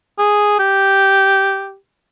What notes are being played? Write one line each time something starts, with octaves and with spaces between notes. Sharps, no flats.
G#4
G4